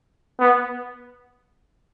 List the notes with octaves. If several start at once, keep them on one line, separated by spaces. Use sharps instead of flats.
B3